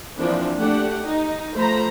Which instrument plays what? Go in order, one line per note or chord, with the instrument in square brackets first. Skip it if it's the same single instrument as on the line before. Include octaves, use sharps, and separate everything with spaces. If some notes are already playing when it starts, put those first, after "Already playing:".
[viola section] E3 F3 A#3 C4 D4
A3 D4 G4 F#5
D#4
F3 A3 C5 A#5 B5